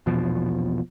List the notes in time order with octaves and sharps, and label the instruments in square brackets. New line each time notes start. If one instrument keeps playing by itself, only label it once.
[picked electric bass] A#1 E2 B2 F3